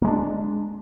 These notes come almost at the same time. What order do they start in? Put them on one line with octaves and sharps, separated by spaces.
A#3 G#3 D4